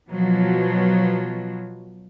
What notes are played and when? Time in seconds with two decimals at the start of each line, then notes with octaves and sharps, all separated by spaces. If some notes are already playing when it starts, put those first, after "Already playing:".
0.11 B2 F3 F#3